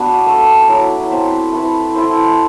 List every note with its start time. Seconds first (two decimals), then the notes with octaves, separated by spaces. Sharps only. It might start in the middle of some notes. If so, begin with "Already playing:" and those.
Already playing: B3 D4 F#4
0.26 A3 D4 A4
0.68 F#3 A3 E4 A4
1.10 C4 F#4 C5 E5
1.52 A3 C4 E4 B4
1.95 E4 A4 C5